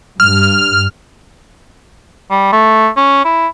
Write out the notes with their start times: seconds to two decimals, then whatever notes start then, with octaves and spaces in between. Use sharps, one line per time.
0.20 G2 F6
2.31 G3
2.52 A3
2.97 C#4
3.25 E4